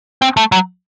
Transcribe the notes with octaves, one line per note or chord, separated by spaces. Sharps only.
C4
A3
F#3